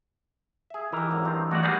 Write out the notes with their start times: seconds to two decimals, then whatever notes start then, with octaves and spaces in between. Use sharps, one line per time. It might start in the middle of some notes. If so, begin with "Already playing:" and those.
0.70 G#4 E5
0.92 E3 D#4 G4 A#4
1.11 G#1 F#2 D3
1.25 G2 D#3 C4
1.51 E3 G#3 A3 D#4 F#4 D5
1.63 G3 A#3 B3 E4 G#4 F#5